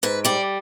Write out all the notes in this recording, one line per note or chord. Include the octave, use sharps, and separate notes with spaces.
G#2 B4
G3 D5